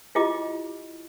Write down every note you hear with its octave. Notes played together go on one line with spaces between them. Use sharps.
E4 F4 G4 D#5 D6